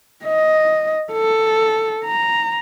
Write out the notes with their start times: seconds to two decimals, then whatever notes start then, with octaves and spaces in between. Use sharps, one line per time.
0.25 D#5
1.13 A4
2.05 A#5